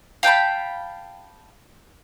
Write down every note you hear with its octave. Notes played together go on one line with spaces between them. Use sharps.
F5 G5 A5 B5